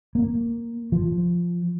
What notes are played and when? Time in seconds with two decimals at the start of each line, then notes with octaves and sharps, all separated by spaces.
0.15 A#3
0.92 F3